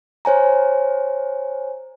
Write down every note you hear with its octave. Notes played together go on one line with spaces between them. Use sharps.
C5 C#5 G#5 A#5